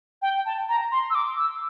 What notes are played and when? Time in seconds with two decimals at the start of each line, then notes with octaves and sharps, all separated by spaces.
0.22 G5
0.45 A5
0.69 A#5
0.92 C6
1.10 E6
1.15 D6
1.38 E6